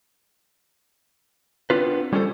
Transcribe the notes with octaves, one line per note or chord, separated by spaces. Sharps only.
B3 C4 D4 F4 B4
G3 C#4 F4 F#4 A4 C5